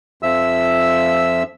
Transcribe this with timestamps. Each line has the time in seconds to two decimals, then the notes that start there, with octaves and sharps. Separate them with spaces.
0.23 F2 F3 E5 E6